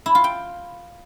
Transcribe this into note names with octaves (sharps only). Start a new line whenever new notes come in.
E4
F4
G5